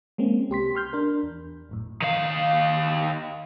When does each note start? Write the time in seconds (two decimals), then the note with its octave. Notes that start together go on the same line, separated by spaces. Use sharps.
0.18 G#3 A#3 C4 C#4
0.50 C2 G4 C6 B6
0.75 C6 F6 G6
0.93 D4 A#4
1.23 E2
1.69 G#1 F#2 A2
2.02 D#3 F5